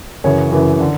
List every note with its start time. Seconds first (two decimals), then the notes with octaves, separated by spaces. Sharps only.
0.24 F#2 C#3 E3 C#5
0.52 F#2 C#3 E3
0.80 D3